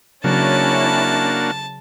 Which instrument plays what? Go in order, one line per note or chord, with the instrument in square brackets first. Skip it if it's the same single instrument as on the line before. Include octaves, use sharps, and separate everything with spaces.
[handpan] C#3 F#3 [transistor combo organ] A#3 D4 F#4 [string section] C#4 E4 [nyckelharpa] A5